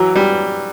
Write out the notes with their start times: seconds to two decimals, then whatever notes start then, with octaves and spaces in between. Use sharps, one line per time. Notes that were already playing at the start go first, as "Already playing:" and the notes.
Already playing: E3 F#3
0.15 G3